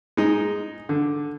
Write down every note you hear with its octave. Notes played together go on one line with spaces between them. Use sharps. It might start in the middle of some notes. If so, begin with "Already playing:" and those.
G#3 D#4
D3